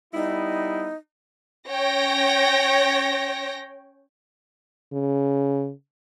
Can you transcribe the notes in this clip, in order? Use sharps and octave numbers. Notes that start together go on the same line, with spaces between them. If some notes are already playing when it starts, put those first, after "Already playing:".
G3 B3 D#4 E4
C#4 C#5 G5 A#6
C#3